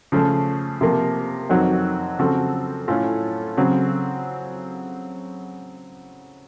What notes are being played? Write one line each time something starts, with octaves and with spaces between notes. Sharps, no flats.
C#3 F3 A3
C3 F3 A#3
F2 D#3 F#3 C4 F#4
C#3 F3 C4 F#4 A4
A2 A3 C#4 F4 A4
C#3 F#3 C4